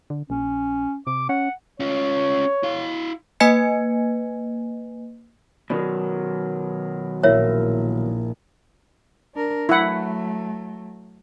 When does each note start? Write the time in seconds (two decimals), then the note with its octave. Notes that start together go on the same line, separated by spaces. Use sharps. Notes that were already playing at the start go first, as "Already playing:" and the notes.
0.10 D3
0.30 A#1 C#4
1.07 C3 D6
1.29 C#4 F#5
1.80 C#4 F4 C#5
2.63 E4 F5
3.40 A#3 B4 D#5 G#5 G#6 C#7
5.70 B2 D#3 F#3 D5
7.23 A#1 A#3 E4 A#4 C#5 E5
9.34 D4 A#4
9.69 F#3 A3 E4 F#5